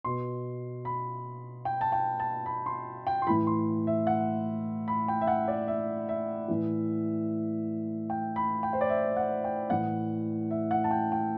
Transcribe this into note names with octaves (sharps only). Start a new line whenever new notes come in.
B2 C6
B5
G5
A5
G5
A5
B5
C6
G5
C6
A2 E3 B5
C6
E5
F#5
B5
G5
E5
F#5
D5
E5
E5
A2 E3
G5
B5
G5
C5
D5
E5
F#5
G5
A2 E3 F#5
E5
F#5
A5
G5
G5